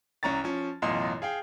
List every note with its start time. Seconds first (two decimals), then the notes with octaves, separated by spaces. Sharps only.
0.23 C2 C#4 A#5 C#6 A6
0.44 F3 C#4
0.82 A1 F#2 B2 F4 D#5 C6
1.22 G#4 F5 G5